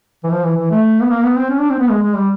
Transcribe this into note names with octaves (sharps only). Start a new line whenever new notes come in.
E3
F3
E3
E3
A3
B3
A#3
B3
C4
C#4
D4
C4
B3
G#3
G#3
G3